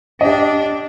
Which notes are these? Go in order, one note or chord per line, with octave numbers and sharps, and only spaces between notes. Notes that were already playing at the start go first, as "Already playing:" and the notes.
D4 G4 D#5